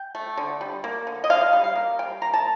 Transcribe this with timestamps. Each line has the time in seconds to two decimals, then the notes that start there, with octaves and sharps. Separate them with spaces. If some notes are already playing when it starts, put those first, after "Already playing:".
Already playing: G5
0.15 A3
0.37 D3
0.61 G3
0.84 A#3
1.07 D3
1.24 D#5
1.30 D3 F5
1.53 G3
1.64 F5
1.75 A#3
1.99 G3 G5
2.22 A#3 A#5
2.34 A5